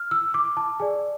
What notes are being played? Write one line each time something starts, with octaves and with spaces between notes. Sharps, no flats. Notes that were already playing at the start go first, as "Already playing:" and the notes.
Already playing: F6
E6
D6
A5
G#4 D5 G#5